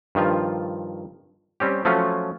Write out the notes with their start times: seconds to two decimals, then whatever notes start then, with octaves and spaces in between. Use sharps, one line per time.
0.15 G2 D#3 F3 F4
1.60 G3 C4 C#4 G4
1.85 F3 F#3 A3 C#4 F4